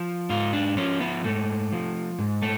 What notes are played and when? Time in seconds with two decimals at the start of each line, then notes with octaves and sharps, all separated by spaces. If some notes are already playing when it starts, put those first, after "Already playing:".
Already playing: F3
0.30 G#2 F4
0.53 D4
0.77 F3 C#4
1.00 B3
1.24 G#2 A3
1.72 F3
2.19 G#2
2.42 A3